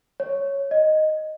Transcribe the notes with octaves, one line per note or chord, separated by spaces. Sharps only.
C#5
D#5